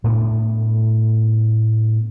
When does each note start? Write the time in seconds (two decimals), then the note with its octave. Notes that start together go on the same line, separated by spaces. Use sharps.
0.04 A2 A3 B3 D4